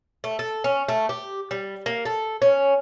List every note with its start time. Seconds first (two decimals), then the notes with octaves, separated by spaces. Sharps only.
0.24 A3
0.39 A4
0.64 C#4
0.88 A3
1.09 G4
1.51 G3
1.86 A#3
2.05 A4
2.42 C#4